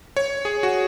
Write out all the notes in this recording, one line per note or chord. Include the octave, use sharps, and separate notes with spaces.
C#5
G#4
F#4